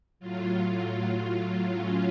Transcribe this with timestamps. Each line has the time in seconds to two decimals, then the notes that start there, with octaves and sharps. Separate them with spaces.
0.20 A2 F#3 F4
1.74 C#4